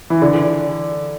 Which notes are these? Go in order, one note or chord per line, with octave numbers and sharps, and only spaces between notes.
E3
D3